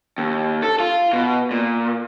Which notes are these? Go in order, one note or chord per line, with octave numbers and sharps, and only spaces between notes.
D#2
A4
F4
B2
A#2